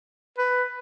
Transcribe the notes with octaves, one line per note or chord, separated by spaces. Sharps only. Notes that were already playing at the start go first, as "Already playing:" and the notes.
B4